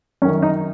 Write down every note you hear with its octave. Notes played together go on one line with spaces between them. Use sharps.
F#2 D#3 C#4
D#4